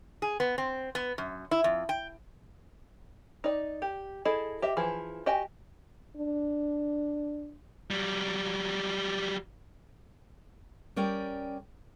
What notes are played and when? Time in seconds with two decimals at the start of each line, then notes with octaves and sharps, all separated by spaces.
0.22 G#4
0.40 B3
0.58 C4
0.95 B3
1.18 F#2
1.51 E4
1.64 F2
1.89 G5
3.44 D#4 D5
3.82 G4
4.25 E4 G#4 A4 D#5
4.62 G4 D#5 E5
4.77 E3 F3 G#4
5.26 F#4 G4 D#5 G5 G#5
6.17 D4
7.91 F#3 G3
10.96 G3 C#4 A#4 D5 G5